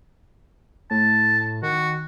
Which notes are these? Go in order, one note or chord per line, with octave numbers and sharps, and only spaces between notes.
A2 A5
D#3 F#4